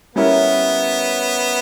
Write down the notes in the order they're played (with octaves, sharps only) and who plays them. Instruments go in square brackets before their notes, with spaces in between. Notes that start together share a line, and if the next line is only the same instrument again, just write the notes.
[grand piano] G3 C#4 E4 A#4 [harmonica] B3